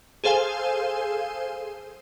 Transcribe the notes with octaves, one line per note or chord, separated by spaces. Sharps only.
G#4 A4 C5 F5 G#5